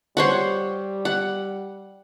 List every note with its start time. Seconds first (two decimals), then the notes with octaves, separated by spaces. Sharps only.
0.17 G3 C5 C#5 F#5
1.05 F#5